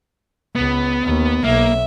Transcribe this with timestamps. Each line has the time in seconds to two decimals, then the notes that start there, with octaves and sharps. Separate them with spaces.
0.56 C#2 B3
1.04 D#2
1.44 B1 A#3 E5